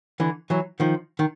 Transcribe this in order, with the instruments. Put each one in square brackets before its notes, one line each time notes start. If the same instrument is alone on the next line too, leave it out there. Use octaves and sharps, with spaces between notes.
[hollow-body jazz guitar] D3 E3
E3 F#3
D#3 F3
D#3